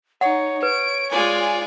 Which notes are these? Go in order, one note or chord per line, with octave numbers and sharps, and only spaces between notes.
D#4 C#5 F#5
B4 D7
G#3 F4 D5 G#5